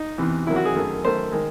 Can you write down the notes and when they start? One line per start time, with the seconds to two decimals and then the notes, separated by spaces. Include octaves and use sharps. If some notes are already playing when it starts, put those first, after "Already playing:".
Already playing: D#4
0.18 E2 C3 E3
0.47 C3 D#3 F#3 E4
0.56 F#4
0.65 G#4
0.75 F#2 D#3 A3
1.04 F#2 D#3 A3 C5
1.32 D#3 G#3